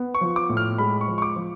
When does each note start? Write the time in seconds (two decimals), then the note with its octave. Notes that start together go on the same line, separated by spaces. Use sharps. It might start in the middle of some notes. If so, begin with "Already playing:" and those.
Already playing: B3
0.15 C#6
0.21 F3
0.36 D6
0.49 A2
0.57 F6
0.78 G#3 B5
1.01 C#6
1.08 F3
1.18 C#6
1.22 D6
1.36 F3